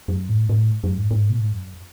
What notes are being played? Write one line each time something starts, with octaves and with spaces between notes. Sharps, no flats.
F#2
A2
A2
F#2
G#2
G#2
B2
A2
G#2
F#2